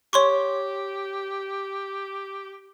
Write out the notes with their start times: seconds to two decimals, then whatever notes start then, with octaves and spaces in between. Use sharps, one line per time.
0.13 G4 C#5 C6 C#6